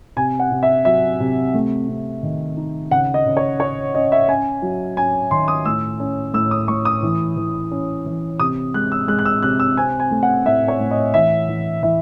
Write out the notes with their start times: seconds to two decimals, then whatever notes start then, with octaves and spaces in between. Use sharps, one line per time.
0.16 C3 G#5
0.40 F#5
0.51 C3
0.63 E5
0.85 F#3 E5
1.20 C3
1.54 A3
1.88 C3
2.23 D#3
2.57 D#4
2.91 C#3 F#5
3.14 D#5
3.26 C#3
3.37 C#5
3.60 C#4 C#5
3.95 C#4 D#5
4.12 E5
4.29 C#4 G#5
4.62 F#3
4.97 C#4 G#5
5.31 D#3 C6
5.48 D#6
5.65 A2 E6
6.00 C#4
6.34 A2 E6
6.51 D#6
6.68 A2 C#6
6.85 D#6
7.03 E3
7.37 E3
7.71 C#4
8.06 E3
8.39 C3 D#6
8.74 G#3 F#6
8.92 E6
9.08 G#3 F#6
9.19 F#6
9.25 E6
9.43 C3 F#6
9.60 E6
9.77 C4 G#5
10.00 G#5
10.11 A3
10.23 F#5
10.45 A2 E5
10.68 C#5
10.80 A2
10.91 D#5
11.14 E3 E5
11.49 E3
11.83 E3 E5